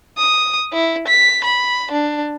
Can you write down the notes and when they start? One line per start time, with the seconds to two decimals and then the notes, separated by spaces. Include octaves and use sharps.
0.17 D#6
0.73 E4
1.08 B6
1.44 B5
1.91 D4